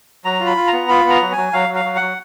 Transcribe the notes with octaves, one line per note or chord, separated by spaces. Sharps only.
F#3 A#5
F4
B5
F4
A#5
B3
F4 B5
B3 A#5
F#3
G#5
F#3
F#3 F5
F#3
F5
F#3
F#5
F#3